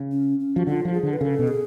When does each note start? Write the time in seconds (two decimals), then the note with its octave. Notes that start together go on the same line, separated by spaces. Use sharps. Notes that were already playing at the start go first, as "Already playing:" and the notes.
Already playing: C#3
0.12 C#4
0.40 C#4
0.56 F3 F#4
0.67 D3 F4
0.85 F3
0.93 G#4
1.03 D3
1.13 B4
1.21 C#3 A4
1.39 B2
1.48 G#4